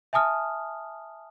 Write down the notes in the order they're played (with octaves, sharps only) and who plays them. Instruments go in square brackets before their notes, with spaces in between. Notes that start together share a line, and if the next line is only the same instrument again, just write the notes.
[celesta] E5 G#5 A5 D#6 F6